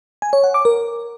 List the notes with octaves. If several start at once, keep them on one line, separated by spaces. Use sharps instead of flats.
G#5
C#5
F#5
D6
A#4